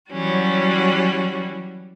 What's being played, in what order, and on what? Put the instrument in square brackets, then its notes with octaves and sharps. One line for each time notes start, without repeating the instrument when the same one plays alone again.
[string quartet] E3 F#3 G3 C#4 F#4